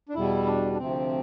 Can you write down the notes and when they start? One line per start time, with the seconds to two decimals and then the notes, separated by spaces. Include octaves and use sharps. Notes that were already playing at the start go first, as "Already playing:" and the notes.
0.09 D4
0.15 E2 B2 G3 E4
0.46 D4
0.73 D4
0.77 D2 C3 F3 C4